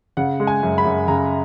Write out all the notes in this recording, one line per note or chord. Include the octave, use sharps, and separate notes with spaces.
C#3 F#5
G#3
G#5
F#2
B5
F#2
C#3 A#5